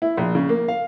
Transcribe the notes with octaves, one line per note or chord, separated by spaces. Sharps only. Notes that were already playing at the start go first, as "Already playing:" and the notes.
E4
A#1
C#3
A#3
F5